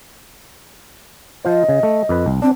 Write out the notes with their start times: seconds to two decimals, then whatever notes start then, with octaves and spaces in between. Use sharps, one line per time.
1.45 F3 F4 C5 D#5
1.69 C#3
1.83 A3
2.09 F2 B4
2.26 C2
2.42 C4 D4